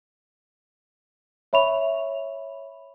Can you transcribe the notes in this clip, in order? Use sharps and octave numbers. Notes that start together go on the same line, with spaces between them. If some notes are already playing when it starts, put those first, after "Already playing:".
C#5 E5 B5 C#6 F7